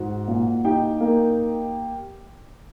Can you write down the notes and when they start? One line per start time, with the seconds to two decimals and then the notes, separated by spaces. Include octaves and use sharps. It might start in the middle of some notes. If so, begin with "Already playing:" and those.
Already playing: G#2 F#4 F#5
0.28 A#2
0.64 D#4 G4 G5
1.01 A#3